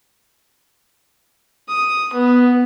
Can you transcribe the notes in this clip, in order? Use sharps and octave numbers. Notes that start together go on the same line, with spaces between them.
D#6
B3